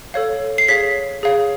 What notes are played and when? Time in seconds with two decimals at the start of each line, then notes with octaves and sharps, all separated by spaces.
0.14 A4 C#5 F5
0.58 C7
0.68 G#4 C#5 F5 B6
1.23 G#4 C#5 F5